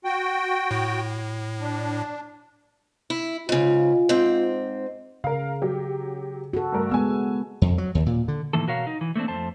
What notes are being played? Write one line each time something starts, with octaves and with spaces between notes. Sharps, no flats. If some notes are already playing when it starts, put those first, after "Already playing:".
F#4 G5
A2
D4
E4
G#2 C#3 F4
G#2 C4
C#3 A#4 F5
F#3 G4
F#4 A4
G2 A3 A#4
G#3 B3 G#5 E6
F2
F#3
D#2
A#2
D3
A2 D#3 E3 A#3 A4
B2 F#4 A#4 C#5 F5
D#4
E3
A3 A#3 C4 D4
F2 A3 C5 A5